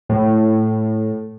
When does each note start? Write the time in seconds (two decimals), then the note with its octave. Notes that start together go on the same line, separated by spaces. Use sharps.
0.09 A2